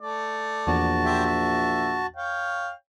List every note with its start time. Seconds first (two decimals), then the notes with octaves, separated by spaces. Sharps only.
0.01 A3 D5
0.67 A#1 E2 F#4 A5
1.05 G4 C5 E5
1.26 E5
2.16 C#5 F5 G5